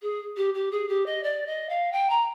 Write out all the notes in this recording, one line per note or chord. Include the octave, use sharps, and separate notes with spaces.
G#4
G4
G4
G#4
G4
D#5
D5
D#5
F5
G5
A#5